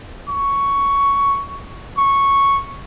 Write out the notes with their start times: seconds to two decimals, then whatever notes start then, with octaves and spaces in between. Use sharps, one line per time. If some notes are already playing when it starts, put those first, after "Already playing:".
0.29 C#6
1.98 C#6